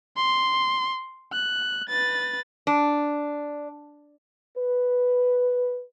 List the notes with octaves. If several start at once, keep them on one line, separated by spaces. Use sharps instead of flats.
C6
F#6
B4 A6
D4
B4